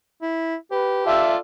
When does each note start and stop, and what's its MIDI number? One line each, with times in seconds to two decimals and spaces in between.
0.22 0.56 64
0.71 1.25 67
0.71 1.03 71
1.06 1.36 65
1.06 1.36 69
1.06 1.36 74
1.06 1.36 76